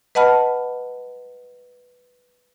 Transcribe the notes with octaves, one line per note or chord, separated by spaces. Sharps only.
B4 D#5 F#5 A5 B5 F6